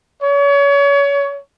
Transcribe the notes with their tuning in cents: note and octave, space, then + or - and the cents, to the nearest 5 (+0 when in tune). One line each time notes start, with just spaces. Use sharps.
C#5 +30